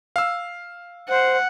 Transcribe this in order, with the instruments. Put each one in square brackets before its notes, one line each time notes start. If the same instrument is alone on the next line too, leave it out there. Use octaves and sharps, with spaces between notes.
[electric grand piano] F5 E6
[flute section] C5 [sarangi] F#5